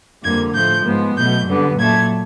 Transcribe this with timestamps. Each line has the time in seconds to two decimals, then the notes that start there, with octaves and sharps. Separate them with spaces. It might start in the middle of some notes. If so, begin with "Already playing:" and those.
0.24 F2 D3 G3 A#3 G#6
0.55 A2 F3 A3 G6
0.85 G#2 F3 G#3 B3
1.17 B2 F#3 A3 G6
1.47 F#2 D3 G3 B3
1.78 A#2 F#3 A3 G#6